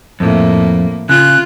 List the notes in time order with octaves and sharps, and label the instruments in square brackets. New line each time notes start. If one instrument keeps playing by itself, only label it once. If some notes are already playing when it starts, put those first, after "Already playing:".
[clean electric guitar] F2 [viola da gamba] A2 A#3
[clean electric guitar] C#3 [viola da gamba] F4 [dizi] F#6